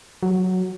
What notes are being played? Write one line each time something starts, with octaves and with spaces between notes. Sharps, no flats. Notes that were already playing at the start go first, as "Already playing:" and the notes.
F#3